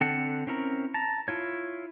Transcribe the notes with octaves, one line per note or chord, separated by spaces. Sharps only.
D3 C4 A4 F#5
C4 C#4 E4 A#4 A#5
A5 A#5
E4 F4 C#5